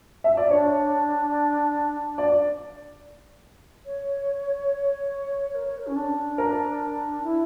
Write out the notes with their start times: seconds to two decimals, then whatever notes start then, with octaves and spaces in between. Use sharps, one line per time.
0.24 E5
0.37 D5
0.50 D4 C#5
2.18 D5
3.85 C#5
5.55 A#4
5.66 C#5
5.78 A#4
5.87 C#4
5.96 D4
6.38 A#4
7.23 E4